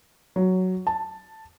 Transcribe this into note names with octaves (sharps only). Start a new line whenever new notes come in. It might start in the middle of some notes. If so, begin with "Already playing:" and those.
F#3
A5